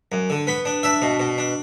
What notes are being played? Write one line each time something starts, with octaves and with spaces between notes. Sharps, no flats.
F#2
D3
B3 B5
D4
D4 E5
B2
B2
D4